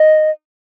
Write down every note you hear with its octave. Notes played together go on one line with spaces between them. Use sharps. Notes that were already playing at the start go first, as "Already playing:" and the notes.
Already playing: D#5